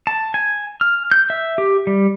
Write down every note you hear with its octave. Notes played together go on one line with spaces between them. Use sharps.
A5
G#5
F6
G6
E5
G4
G3